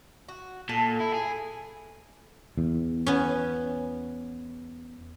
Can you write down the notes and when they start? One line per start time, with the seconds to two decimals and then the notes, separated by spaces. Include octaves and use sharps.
0.29 F#4
0.69 A#2 A4
1.00 E4
1.14 G#4
2.58 E2
3.07 B3 C#4